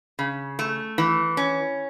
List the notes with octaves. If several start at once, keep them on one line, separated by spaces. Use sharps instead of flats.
C#3
A3
E3
C#4